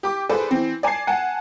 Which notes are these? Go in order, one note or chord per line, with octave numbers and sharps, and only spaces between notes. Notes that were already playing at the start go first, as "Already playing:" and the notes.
G4 D6
G#4 A4 B4 C5 D5
E3 C4
D5 G#5 A5 G#6 C7
F#5 G#5 A5